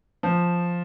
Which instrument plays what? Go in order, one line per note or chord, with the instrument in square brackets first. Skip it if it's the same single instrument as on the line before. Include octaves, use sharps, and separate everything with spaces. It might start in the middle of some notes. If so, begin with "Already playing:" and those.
[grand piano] F3